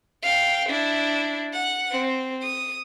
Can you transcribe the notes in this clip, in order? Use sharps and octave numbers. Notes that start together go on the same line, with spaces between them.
F5 G5
D4 E4
F#5
C4
D#6